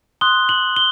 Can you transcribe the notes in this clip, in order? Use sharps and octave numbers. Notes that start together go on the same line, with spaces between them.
C6 D#6 F#6 G7
F#7
G7